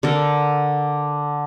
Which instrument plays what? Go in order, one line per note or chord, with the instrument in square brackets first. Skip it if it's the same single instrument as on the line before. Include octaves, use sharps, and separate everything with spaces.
[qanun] D3 A4 A#4